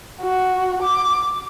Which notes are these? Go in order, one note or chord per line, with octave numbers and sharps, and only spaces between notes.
F#4
D6